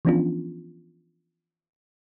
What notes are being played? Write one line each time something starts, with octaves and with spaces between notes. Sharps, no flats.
E3 F3 B3 C#4 D4 F4